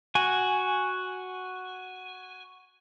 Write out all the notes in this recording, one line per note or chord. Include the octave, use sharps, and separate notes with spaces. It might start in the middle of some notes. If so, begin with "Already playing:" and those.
F#4 G#5